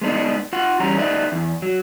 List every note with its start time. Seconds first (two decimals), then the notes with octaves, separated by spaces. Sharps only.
0.01 G#3 B3 D4 D#4
0.53 F4 F#5
0.80 E2 G3 C#4 A#5
0.98 D#4 B4 D5 E5
1.32 E2
1.62 F#3